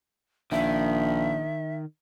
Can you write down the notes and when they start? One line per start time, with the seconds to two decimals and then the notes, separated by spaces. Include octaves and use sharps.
0.52 A#1 D#3 E5